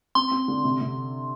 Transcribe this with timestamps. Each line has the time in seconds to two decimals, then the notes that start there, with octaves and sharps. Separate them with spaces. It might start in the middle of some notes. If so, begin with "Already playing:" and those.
0.15 C4 C6
0.31 C4
0.48 D3
0.64 C3
0.81 C3